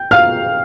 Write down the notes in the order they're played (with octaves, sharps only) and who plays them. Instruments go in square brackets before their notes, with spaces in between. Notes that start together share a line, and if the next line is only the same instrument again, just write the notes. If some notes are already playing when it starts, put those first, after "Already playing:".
Already playing: [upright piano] G5 G6
F5 F6